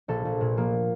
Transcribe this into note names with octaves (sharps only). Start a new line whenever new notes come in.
A#1 A4
A#1
A#2
F3 A#3